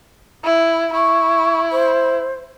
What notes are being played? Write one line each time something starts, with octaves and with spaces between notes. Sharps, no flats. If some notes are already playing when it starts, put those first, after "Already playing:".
E4
E4 C#6
C5